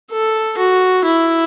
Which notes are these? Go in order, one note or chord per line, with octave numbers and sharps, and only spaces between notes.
A4
F#4
E4